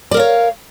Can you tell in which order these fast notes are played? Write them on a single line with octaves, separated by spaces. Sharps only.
D5 A#4 F5 C#5